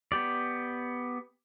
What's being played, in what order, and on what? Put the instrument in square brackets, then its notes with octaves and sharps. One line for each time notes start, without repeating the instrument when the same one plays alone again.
[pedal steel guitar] B3 G4 D5